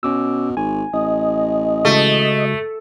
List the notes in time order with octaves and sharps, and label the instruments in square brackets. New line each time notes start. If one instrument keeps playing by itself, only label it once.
[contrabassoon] B2 [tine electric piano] C#4 D6 E6
[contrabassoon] G#1 [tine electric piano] G#5
[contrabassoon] A1 [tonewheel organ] D#5
[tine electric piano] C#3 G#3 F#4 [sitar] A3